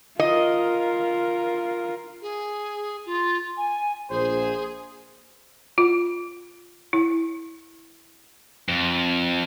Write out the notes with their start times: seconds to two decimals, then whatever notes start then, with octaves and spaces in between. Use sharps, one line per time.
0.19 F4 A#4 D#5
2.22 G#4
3.06 F4
3.57 G#5
4.11 A#1 G#4 C5
5.78 F4
6.93 E4
8.69 F2